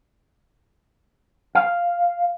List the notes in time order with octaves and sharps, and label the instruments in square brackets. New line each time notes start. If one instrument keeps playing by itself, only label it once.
[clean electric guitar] F5